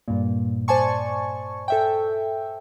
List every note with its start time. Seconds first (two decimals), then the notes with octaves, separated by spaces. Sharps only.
0.08 G2 A#2
0.68 C5 D5 G#5 A5 C#6
1.68 A4 E5 G5